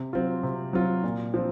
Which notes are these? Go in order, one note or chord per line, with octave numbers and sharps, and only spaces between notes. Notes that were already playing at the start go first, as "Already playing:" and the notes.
Already playing: C3
F#3 C4 F4
C3
F#3 C4 F4
A#2
F3 C4